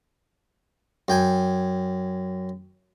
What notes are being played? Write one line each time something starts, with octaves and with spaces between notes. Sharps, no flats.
F#2 G5 G#5